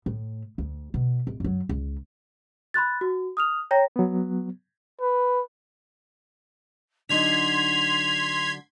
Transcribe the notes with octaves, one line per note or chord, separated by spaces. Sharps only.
A2
D2
B2
D1
F#2 F#3
C#2
B5 C6 F#6 A6
F#4
D#6 F6 F7
C#5 G5 A#5 A#6
F#3 B3
B4
D3 F#3 D#4 C6 G#6 B6 F7